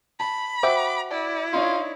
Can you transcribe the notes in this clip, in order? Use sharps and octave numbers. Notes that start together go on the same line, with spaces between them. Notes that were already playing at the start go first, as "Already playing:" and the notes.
A5 B5
F#4 C5 E5 G5 D6
E4 D5
D4 D#4 F4 C#5